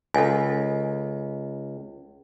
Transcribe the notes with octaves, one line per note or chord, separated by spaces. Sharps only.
C#2 A4 G#5